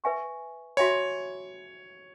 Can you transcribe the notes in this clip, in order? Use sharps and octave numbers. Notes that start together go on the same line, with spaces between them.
B4 E5 G#5 C#6
F#4 C#5 E5 G#5 B5